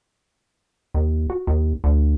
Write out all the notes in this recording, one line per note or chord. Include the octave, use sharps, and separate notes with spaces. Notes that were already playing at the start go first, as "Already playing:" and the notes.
D#2
F#4
D#2
D2